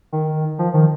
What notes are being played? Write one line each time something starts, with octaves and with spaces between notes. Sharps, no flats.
D#3
F3
D#3